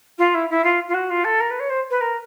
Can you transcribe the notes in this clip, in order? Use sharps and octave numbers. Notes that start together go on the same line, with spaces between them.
F4
E4
E4
F4
F4
F#4
F4
A4
A#4
B4
C#5
C5
B4
A#4